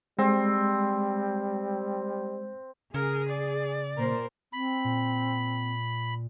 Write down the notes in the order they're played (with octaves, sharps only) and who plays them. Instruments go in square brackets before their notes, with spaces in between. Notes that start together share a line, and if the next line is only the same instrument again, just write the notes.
[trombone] G3 [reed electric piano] G#3 [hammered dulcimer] C4
[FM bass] C#3 [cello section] G#4 [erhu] A#4
[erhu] D5
[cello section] A#2 A#4 C5
[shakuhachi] C4 [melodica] B5
[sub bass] A#2